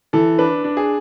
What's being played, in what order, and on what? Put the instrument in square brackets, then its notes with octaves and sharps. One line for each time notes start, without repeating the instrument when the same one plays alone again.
[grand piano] E3 A4
D4 B4
D4
G#4